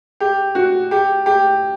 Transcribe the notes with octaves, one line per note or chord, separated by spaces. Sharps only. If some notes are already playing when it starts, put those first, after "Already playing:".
G4
F#4
G4
G4